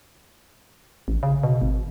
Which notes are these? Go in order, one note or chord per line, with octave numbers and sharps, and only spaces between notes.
A1
C#3
B2
G#1